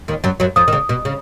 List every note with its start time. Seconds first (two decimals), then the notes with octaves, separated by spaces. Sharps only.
0.08 D#2 D#3
0.24 F#2 F#3
0.40 F#2 F#3
0.56 F2 F3 D#6
0.68 D#3
0.73 C#3
0.89 B2
1.05 C#3